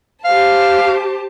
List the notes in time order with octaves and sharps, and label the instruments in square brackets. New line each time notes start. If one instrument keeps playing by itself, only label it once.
[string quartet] G4 C5 A5 [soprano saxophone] F5